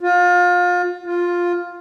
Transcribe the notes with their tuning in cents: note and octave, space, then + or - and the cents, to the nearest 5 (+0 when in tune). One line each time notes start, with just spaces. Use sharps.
F4 +30
F4 +5